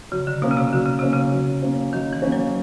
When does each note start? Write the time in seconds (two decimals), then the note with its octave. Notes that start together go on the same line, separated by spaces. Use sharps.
0.12 C#3 F#3
0.27 D3
0.42 B2 A#3 C#4
0.51 C#3
0.57 C3
0.73 D3 F#3
0.86 C#3
0.99 C3 A#3 C#4
1.13 C#3
1.32 F#3
1.62 A#3 C#4
1.93 D#3 F#3
2.13 E3
2.22 A#3 C#4
2.32 F#3